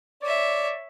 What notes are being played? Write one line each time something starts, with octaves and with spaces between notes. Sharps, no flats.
C#5 D5 E5